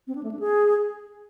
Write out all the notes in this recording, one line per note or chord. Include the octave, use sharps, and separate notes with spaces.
C4
D4
A3
D4
G#4